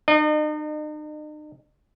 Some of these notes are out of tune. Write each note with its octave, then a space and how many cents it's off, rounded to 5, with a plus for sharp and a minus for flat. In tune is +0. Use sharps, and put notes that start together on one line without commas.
D#4 -45 D#5 -35